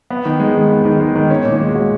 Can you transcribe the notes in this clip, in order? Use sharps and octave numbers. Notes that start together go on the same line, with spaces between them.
B3
D#3
G#3
D#3
B3
D#3
G#3
D#3
C#4
A#2
G#3
F#4